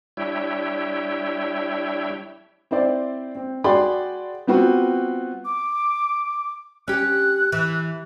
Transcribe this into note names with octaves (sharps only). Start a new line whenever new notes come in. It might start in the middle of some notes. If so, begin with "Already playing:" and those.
G3 D4 E4 C#5 E5 G5
C4 E4 C5 D5
C4
F#4 G#4 D5 G5 B5 C6
G3 B3 C4 F4 F#4 B4
D6
C#4 G4 F#6
E3